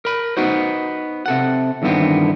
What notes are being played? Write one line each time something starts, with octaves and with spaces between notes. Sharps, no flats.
A#4 B5
B3 D#4 F#4 C5
C3 A4 F#5
E2 G2 D3 D#3 B3 C4